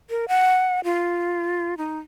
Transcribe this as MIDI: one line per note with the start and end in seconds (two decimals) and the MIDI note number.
0.10 0.25 70
0.28 0.80 78
0.84 1.77 65
1.78 1.98 63